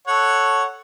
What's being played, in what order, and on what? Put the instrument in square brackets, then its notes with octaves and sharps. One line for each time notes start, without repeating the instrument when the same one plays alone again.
[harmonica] A4 C#5 F#5